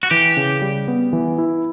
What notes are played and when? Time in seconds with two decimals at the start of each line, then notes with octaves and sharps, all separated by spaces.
0.03 F#4
0.11 E3 G4
0.37 C#3
0.62 G3
0.88 B3
1.13 E3
1.38 E4